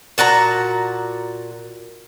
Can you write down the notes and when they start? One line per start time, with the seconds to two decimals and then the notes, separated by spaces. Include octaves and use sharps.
0.18 A#2 F#4 A5 A#5